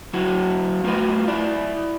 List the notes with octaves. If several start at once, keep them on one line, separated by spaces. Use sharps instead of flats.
F#3 E4 F#4
A3 F4 F#4 B4
E4 D5